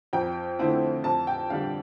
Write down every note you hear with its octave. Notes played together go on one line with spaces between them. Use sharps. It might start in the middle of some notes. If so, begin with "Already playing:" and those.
F2 G5
D3 A3 C4 E4
F2 A5
G5
D3 G3 F5